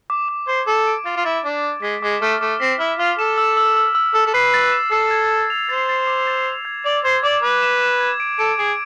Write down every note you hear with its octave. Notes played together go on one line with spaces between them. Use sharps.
D6
D6
C5 G#6
A4 D6
D7
F4 A6
F4
E4 A6
D4 A6
A6
G#3 B6
G#3 D6
A3 F6
A3 D6
C4 B6
E4 F6
F4 F6
A4 E7
E6
E6
E6
E6
A4 E6
A4
B4 C7
A6
E7
A4 C7
G#6
G#6
F7
C5 A6
A6
D6
A6
F7
G#6
D5 F7
C5 G#6
D5 D6
B4 D6
E7
E7
G#6
D7
A4 D7
G#4 D7